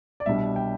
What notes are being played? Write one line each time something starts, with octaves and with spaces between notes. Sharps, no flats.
D5
C2 B2 G3 D4 E5
G5